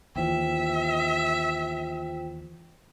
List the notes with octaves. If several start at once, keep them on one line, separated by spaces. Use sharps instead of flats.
D#2 E3 F4 C5 E5 G5